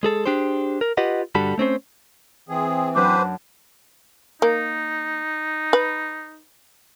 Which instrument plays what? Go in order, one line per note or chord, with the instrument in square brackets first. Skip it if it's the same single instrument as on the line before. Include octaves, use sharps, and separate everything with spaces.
[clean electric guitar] G#3 G#4 A4
D4 G4 G#4 C5
A#4
F4 G4 B4 D#5 F#5
G2 D3 G3 F#4 A4 B5
A3 C4 C#4 C5
[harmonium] E3 C4 [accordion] G#4
[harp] F#2 F#3 D4 [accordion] B4 C5 [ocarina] D6
[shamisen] A#3 [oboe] D#4
[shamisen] B4